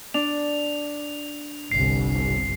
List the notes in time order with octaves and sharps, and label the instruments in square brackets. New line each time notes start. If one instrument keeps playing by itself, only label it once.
[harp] D4 [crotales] F7
[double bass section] G1 C2 [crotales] C7